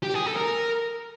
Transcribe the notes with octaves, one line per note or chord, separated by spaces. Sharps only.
G4
G#4
A4
A#4